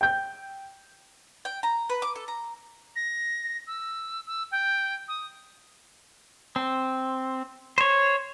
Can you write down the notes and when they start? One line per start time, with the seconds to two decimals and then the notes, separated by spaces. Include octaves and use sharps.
0.01 G5 G6
1.45 G5
1.63 A#5
1.90 B4
2.02 D6
2.16 A4
2.28 A#5
2.96 A#6
3.67 E6
4.27 E6
4.51 G5
5.08 D#6
6.56 C4
7.78 C5 C#5